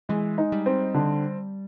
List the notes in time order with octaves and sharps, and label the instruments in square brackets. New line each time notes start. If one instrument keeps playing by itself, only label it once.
[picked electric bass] E3 [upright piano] G#3
[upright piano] D#4
[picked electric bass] G3
[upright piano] C4
D3